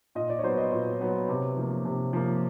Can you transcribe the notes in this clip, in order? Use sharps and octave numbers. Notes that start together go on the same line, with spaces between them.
A#2 D#5
D5
C#5
F#3 B3 C5
D#5
A#2 C#5
F#3 B3
C3
F3 A#3
C3
F3 A#3